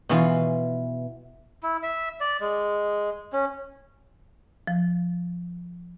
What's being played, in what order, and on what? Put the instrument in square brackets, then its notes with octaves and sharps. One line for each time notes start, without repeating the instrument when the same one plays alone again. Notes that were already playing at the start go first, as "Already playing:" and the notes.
[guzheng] B2 E3 F4
[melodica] E4
E5
D5
G#3
C#4
[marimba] F3